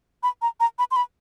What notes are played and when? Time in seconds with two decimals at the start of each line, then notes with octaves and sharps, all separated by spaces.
0.23 B5
0.42 A#5
0.60 A#5
0.79 B5
0.91 C6
0.96 B5